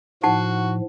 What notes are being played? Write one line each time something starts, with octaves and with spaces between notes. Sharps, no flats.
A2 F3 D#4 F#4 F#5 A5